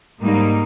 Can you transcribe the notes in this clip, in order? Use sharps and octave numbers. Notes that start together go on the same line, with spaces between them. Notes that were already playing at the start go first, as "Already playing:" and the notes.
G#2 G3 A#3 D#4